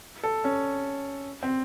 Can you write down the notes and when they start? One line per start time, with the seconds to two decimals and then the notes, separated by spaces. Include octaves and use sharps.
0.24 A4
0.44 C#4
1.43 C4